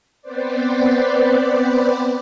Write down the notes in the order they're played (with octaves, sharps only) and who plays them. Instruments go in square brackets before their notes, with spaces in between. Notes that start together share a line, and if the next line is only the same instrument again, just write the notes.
[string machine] B3 C4 B4 C5 D5